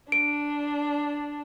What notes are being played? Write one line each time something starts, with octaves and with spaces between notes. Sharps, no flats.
D4 D7